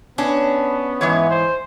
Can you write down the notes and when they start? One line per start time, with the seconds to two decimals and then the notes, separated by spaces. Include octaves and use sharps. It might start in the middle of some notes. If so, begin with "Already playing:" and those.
0.18 B3 C#4 D4
1.01 G#2 E3 C#5
1.30 C5